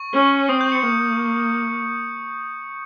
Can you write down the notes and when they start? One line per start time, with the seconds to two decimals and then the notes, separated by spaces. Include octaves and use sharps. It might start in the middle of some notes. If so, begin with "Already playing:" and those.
Already playing: C#6
0.14 C#4
0.49 C4 D#6
0.61 G6
0.72 C#7
0.83 A#3